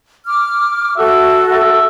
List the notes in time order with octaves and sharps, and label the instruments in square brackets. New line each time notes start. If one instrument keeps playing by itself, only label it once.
[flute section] D6 F6
[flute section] F#4 A4 [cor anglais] E5
[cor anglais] E5